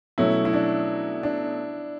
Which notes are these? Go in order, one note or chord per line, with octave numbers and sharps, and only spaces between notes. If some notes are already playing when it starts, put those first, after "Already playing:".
B2 F#3 A3 C#4 E4
E4
D4
D4